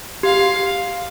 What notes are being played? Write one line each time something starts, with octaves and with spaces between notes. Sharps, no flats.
G4 F5